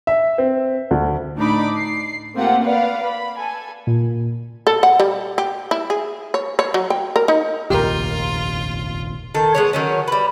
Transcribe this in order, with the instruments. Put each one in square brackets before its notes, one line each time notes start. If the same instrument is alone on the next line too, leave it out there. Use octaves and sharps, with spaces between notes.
[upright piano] E5
C4
D2
[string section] A2 D4 D#4 D5 B5 D6
C7
A3 A#3 C4 F4 G4 F#5
B4 D5 F5 F#5
B5
A4 G#5
[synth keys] A#2
[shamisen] A4
F#5
G3
G4
E4
G#4
C#5
C#5
F#3
G5
A#4
D#4
[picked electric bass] F1 A#1 D#2 [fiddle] F4 [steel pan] G4 A#4
[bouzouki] D#3 A4
G#3 B3 C#5
D#3 F#3 C#4
G3 B4